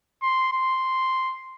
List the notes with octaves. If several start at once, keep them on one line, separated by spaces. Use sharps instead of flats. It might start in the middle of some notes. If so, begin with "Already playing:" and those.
C6
C6